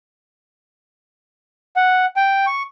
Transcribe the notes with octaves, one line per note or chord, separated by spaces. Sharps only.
F#5
G5
C#6